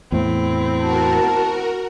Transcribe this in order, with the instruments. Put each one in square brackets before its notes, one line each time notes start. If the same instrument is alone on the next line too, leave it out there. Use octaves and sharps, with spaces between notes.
[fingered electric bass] E2 A2 [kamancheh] C4 E4
[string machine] F#4 A#4 [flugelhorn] A5